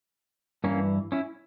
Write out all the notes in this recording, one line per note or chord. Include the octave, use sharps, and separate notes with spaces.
G2 E3 A#3 C#4
C#4 E4